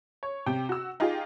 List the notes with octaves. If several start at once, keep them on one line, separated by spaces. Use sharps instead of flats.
C#5
C3 G5
F#4 E6
D#4 F4 G4 G#4